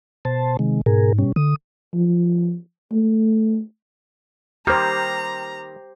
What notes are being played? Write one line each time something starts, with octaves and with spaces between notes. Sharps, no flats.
B2 C5 A5
C3 D#3 G#3
G#2 B2 G#4 A#4
B2 G3 C#4
D3 D#6
F3
A3
D#3 G3 A#3 G4 C5 A#5